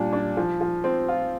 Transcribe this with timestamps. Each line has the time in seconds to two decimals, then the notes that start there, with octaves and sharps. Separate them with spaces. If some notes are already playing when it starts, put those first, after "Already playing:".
Already playing: A#2 G3 D4
0.13 D4
0.37 F3
0.61 F3
0.84 C4
1.08 F4